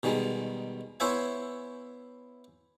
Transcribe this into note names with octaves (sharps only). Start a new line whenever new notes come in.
B2 D#3 G3 G#3
B3 E4 C5 C#5 E5 G#5